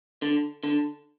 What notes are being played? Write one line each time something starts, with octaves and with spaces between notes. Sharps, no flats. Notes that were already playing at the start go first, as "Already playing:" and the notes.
D3
D3